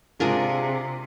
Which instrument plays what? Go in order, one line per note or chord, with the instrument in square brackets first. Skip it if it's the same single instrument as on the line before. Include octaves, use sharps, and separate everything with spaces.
[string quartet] C3 [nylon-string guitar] G#3 G#4 [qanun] D4 F4 A#4